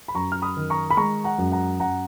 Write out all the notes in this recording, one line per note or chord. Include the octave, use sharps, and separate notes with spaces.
B5
F#2 A#5 C#6
F6
B5 D#6
D#3
A#5 C#6
B5
G#3 A#5 C#6
F#5 A#5
F#2
F#5 A#5
F#2 F#5 A#5